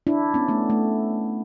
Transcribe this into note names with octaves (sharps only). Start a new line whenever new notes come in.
D4 E4
B3 C#4
A3 B3
A3